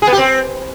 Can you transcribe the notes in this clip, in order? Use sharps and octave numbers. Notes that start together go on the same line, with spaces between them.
G#4
B3
G4
C4